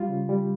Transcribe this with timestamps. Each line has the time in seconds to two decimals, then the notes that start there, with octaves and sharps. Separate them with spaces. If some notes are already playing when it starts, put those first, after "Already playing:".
Already playing: G3 F4
0.09 C#3
0.29 G3